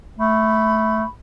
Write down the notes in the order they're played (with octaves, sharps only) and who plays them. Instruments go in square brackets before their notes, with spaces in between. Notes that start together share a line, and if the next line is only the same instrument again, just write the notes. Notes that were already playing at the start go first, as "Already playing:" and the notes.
[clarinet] A3 [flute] B5